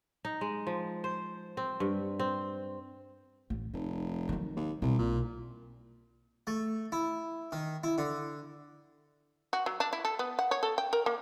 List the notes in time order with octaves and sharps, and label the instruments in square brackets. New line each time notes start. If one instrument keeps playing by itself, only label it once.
[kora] D#4
G#3
F3
C5
C4
G2
C4
[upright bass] A1
[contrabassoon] F1 [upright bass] D#4
[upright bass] D#3 F#3
[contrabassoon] D#2
[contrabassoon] C2 [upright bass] B2
[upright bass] B1 [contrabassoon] A#2
[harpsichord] A3
E4
D#3
E4
D3
[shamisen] F#4
F#3
D4
E4
A4
B3
F#5
C#5
A4
G5
A#4
A#3